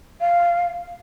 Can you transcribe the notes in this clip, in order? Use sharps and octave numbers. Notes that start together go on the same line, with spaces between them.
F5